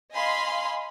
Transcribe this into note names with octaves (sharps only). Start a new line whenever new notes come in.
D#5 F5 G#5 B5 C6